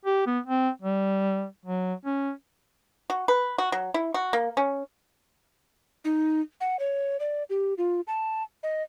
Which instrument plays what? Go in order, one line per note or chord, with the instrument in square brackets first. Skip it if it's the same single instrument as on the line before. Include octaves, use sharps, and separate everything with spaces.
[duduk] G4
B3
C4
G3
F#3
C#4
[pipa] F#4
B4
F#4
F#3
E4
F#4
A#3
C#4
[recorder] D#4
F#5
C#5
D5
G4
F4
A5
D#5